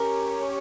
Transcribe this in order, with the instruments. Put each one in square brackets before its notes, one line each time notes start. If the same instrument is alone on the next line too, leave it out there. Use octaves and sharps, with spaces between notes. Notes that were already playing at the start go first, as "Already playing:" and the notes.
Already playing: [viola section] C#4 G4 C#5 [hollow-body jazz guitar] A#4